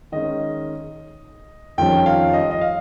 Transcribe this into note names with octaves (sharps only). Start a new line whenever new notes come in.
D#3 G#3 C#4 D#5
F2 D#3 G3 C#4 G5
F5
D#5
D#5
F5